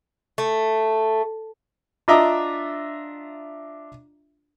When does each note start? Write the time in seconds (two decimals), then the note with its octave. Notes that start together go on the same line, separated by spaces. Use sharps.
0.38 A3
2.08 D4 F4 D#5 E5 A#5 D6